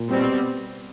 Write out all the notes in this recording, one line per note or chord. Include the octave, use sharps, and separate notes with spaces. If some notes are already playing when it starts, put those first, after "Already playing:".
Already playing: A#2
B2 G3 C4